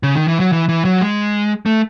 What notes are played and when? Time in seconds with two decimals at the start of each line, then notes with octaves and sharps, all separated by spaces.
0.03 C#3
0.15 D#3
0.28 E3
0.40 F#3
0.52 E3
0.69 E3
0.85 F#3
1.01 G#3
1.66 A3